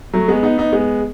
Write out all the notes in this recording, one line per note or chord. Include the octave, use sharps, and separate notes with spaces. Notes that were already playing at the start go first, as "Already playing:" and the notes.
F#3 A3
G#3 B3
B3 D#4
B3 D#4
G#3 B3